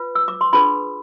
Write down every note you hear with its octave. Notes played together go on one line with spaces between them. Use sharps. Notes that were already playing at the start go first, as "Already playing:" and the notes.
Already playing: F4 B4
E6
D6
C6
D4 F4 G#4 B4 B5